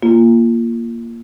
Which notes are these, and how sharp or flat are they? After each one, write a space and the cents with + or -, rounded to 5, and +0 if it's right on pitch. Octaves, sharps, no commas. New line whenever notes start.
A#3 +0 F4 -20